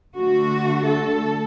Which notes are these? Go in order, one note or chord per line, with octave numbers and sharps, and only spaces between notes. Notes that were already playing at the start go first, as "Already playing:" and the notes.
D3 A3 F#4
A4